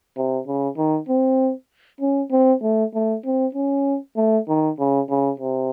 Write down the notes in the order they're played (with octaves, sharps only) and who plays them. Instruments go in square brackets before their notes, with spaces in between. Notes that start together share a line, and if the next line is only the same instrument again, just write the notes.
[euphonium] C3
C#3
D#3
C4
C#4
C4
A3
A3
C4
C#4
A3
D#3
C#3
C#3
C3